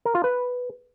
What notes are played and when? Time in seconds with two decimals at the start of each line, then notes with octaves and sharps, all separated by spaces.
0.05 A#4
0.15 F4
0.24 B4